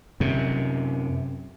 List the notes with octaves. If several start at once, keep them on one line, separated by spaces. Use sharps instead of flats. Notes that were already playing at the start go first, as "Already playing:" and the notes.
F#2 C3